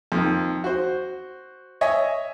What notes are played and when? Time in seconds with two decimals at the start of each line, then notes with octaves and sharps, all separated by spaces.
0.12 F2 D#3
0.64 F#4 C5
1.81 C#5 D#5 E5 G#5